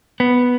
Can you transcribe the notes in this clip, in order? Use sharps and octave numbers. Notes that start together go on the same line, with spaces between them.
B3